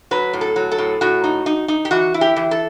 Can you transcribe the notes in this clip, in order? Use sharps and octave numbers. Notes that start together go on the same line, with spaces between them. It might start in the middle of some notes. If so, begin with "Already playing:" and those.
F#3 B4
A2
A4
F#3
A4
A2
A2 F#4
D#4
D#4
D#4
G4
E3 F#4
E4
G4
E3
A4